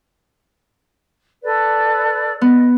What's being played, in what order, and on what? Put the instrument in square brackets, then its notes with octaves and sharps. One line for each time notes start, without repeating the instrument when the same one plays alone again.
[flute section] A4 B4 D5
[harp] B3 [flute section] D#5